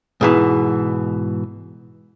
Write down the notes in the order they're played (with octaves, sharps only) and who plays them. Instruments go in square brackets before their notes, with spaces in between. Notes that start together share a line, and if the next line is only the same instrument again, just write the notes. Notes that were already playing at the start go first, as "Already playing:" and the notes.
[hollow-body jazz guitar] G#2 B2 E3